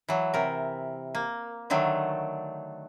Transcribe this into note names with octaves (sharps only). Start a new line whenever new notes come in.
E3 F#3
C3 A#4
A#3
D3 D#3 F#3 A3